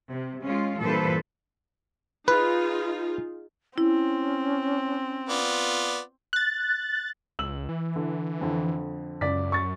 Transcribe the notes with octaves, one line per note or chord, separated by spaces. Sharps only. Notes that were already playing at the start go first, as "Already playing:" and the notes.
C3
G#3 C#4 F4
G2 A#2 E3 A4 B4 C5
D#4 F4 G#4 B4
C4 C#4 E4
B3 F4 D5
F#6 A6
C#2 E6 F#7
E3
D3
F2 D3
C#2 F#2 D5 B6
C#6 A6